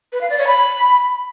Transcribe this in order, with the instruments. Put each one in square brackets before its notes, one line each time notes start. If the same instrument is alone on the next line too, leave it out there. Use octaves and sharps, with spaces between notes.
[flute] B4
F5
D5
C#5
B5